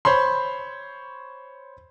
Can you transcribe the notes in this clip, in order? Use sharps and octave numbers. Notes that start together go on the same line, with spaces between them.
C5 C#5 B5 C6